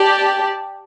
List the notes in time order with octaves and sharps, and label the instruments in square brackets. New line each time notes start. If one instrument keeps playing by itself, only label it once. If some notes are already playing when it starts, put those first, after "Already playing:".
Already playing: [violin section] G4 D5 A5